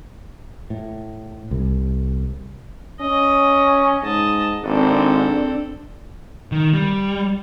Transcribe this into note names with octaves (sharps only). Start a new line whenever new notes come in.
A2
C2
C#4 D#5
G#2 D#5 A5
G#1 C4 D4 A4
D#3
G3